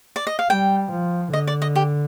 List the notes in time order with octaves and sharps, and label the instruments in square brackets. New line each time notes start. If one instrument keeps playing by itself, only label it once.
[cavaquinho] D5
D#5
F5
[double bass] G3 [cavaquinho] G5
[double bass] F3
[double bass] D3 [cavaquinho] D#5
[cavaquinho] D5
D#5
G4